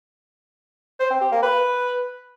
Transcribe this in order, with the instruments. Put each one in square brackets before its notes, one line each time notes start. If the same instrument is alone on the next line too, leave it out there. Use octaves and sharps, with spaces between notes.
[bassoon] C5
C4
G4
A#3
B4